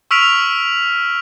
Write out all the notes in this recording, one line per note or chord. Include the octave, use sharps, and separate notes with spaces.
C#6 E6 F6 B6 D7 F7